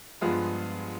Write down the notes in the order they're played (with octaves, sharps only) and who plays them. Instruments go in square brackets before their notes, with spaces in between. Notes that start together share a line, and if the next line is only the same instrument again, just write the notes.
[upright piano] G2 F3 G#3 B3 F4 G#4